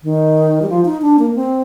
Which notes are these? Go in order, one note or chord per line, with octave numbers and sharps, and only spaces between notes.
D#3
G3
F3
D#4
D4
A#3
C4